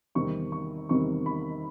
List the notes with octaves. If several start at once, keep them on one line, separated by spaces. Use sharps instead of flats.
E2 C3 D#3 G3 C4 C#6
C#6
E2 C3 D#3 G3 C4 C#6
B5